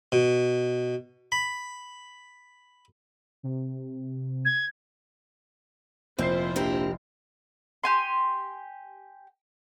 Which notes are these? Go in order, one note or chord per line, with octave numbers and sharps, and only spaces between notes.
B2
B5
C3
G#6
F1 A#2 C4 E4 F4 C5 G6 C7
A#1 C4 G4 A#4
G4 G#5 C6